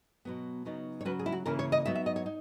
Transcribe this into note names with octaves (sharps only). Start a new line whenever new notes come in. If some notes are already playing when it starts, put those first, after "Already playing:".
B2 F#3 B3
C#3 F#3 B3 D#4
C#5
C#3 F#3 C#4 B4
G#4
E4
F#4
C#3 E3 A#3 C#4 E4 A#4
C#5
D#5
F#3 B3 D#4 E5
E5
D#5
C#5
D#4